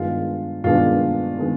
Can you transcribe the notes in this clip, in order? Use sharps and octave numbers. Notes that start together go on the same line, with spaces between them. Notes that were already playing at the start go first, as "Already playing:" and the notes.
Already playing: G2 D#3 G#3 B3 D4 F4
G2 D#3 G#3 B3 D4 F4
D#3 G#3 B3 D4